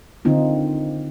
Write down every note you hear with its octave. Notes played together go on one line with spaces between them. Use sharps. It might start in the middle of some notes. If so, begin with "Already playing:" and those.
D3 D#3 C4 D#4 F4